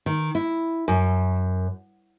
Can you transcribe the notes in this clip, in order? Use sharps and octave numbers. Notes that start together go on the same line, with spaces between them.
D#3
E4
F#2